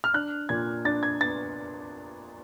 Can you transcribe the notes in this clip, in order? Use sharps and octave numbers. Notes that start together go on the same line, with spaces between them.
F6
D4 F#6
A#2 G#6
D4 A6
G#6
B3 A6